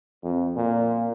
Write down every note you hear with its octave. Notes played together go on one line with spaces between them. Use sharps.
F2
A#2